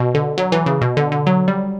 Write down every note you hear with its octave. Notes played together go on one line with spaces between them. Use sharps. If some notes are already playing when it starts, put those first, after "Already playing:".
Already playing: B2
D3
F#3
E3
C#3
B2
D3
D3
F#3
G3